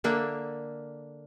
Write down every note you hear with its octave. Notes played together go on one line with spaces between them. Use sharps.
D3 A#3 D4 E5